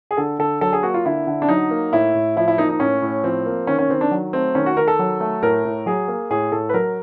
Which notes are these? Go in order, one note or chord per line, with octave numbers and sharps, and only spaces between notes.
G#4
D3 A4
D3 A4
F#3 A4
G#4
A#3 F#4
F4
D3 E4
D3
D4
F#3 D#4
A#3
A2 E4
A2
F3 E4
E4
A#3 D#4
D#4
A2 C#4
A2
F3 C4
A#3
D#3 C#4
C#4
D#3 C4
D4
F#3
A3 C4
D#3 C#4
F#4
D#3 A#4
A4
F#3
A3
A2 A#4
A2
F#3 G#4
A#3
A2 G#4
A2 A4
B4
F#3 A#4